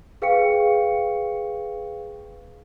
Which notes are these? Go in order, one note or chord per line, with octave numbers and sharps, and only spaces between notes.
G#4 B4 F5 G5 C#6 C#7